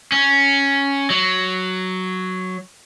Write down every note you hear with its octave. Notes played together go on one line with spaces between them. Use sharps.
C#4
F#3